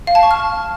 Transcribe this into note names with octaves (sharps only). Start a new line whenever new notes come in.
F5
A5
C#6
F6